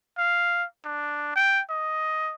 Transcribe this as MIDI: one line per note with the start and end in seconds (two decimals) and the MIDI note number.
0.18 0.65 77
0.85 1.32 62
1.36 1.61 79
1.70 2.35 75